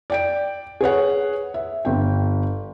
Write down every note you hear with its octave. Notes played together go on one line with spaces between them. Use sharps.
D5 G5 D7
G#4 B4 C#5 F#5
E5
G1 G5